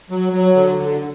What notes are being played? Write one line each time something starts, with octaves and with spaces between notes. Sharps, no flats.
F#3
F#3
D3
D3